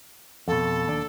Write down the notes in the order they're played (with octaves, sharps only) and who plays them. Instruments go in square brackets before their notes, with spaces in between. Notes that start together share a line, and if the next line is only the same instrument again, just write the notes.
[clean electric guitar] F2 B2 [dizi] A4
[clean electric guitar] D#2 D4